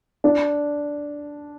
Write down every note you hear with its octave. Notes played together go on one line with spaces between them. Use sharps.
D4